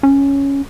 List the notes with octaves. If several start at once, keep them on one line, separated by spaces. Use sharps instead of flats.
C#4